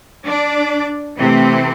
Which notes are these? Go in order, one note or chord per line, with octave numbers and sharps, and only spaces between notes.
D4 D5
C3 E3 A3 C4